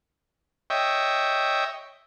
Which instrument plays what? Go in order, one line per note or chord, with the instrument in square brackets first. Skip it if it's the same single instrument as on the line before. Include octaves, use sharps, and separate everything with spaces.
[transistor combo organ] C#5 D#5 E5 G5